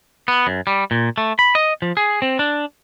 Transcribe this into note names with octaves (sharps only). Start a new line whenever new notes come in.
B3
F#2
G3
A#2
A3
B5
D#5
F3
G#4
C4
D4